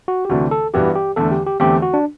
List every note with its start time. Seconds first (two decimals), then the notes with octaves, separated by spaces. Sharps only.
0.08 F#4
0.25 G4
0.30 D2 C3 E3 A3 D4 F#4
0.51 A4
0.74 G2 E3 B3 F#4 G4
0.96 G4
1.16 E2 D3 A3 A4
1.31 G4
1.46 G4
1.60 E2 D3 A3 C4 G4
1.82 F#4
1.94 D4